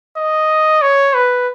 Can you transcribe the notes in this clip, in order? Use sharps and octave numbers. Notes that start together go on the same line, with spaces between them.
D#5
C#5
B4